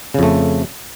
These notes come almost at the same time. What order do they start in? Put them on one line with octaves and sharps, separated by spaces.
C#3 F2 A3